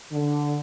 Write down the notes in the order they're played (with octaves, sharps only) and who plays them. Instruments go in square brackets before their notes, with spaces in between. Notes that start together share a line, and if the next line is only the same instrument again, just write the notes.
[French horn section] D3